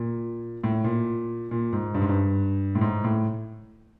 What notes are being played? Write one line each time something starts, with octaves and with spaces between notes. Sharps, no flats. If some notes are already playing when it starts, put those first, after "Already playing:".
Already playing: A#2
A2
A#2
A#2
G#2
G2
G#2
G2
A2
G#2
A2